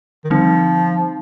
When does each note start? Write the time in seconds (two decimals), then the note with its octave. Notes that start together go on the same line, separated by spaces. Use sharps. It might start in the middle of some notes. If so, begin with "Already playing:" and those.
0.24 D#3
0.30 D3 F3 G3 C4 D#4